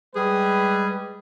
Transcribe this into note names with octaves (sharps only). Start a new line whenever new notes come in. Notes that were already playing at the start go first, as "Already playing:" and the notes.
G3 G#3 G#4 B4